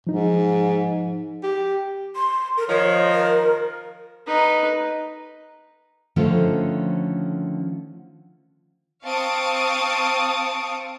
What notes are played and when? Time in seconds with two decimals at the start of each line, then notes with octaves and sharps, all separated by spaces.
0.07 G#2 F3 D#4
1.43 G4
2.16 C6
2.57 A#4
2.69 D#3 F3 C#5
3.14 A#4
4.26 D#4 B4
6.16 D3 D#3 F3 A3 C#4 C5
9.05 C4 F5 A5 C#6 D#6 D7